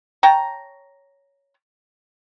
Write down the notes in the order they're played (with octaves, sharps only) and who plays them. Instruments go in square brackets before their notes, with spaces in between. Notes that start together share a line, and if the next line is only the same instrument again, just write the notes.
[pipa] C#5 G5 A5 A#5